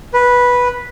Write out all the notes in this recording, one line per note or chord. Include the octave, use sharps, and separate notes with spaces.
B4